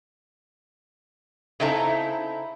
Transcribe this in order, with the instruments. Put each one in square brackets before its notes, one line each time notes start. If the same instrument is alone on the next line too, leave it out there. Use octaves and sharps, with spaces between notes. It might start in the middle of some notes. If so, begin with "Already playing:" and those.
[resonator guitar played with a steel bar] C#3 C4 D#4 E4 A4 A#5